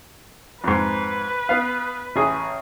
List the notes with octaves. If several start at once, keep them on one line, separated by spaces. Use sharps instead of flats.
F2 G#2 B4
B3 F5
A1 G#4